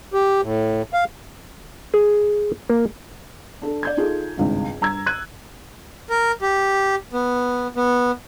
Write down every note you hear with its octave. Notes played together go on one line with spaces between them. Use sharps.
G4
A2
F5
G#4
A#3
D4 A4
D5 G6 G#6
D#4 F4 G#4 A4
G#1 C#2 G2
G2 A#5 E6 G#6
F#6 G#6 D#7
A#4
G4
B3
B3